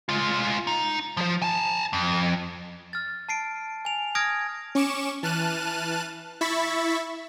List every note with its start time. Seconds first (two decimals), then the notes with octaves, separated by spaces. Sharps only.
0.09 G#3 F4
0.67 D#4
1.17 F3 C5
1.42 G#5 A5
1.93 F2
2.93 F6 A6
3.29 A5 C7 D7
3.85 G#5 F7
4.15 D#6 F6 G#6 A#6 D7
4.75 C#4 C#6 D6 E7
5.23 E3 A5 F6 F#6 D#7
6.41 E4 E5 B5 C#6 A6 B6